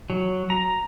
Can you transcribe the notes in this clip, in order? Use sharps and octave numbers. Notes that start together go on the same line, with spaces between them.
F#3
A#5